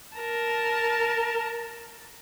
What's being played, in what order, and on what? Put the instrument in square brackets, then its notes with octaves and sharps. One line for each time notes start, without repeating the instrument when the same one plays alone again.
[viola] A#4 A5